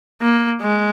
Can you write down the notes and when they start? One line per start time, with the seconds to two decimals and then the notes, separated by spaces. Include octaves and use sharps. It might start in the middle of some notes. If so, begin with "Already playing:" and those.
0.22 A#3
0.61 G#3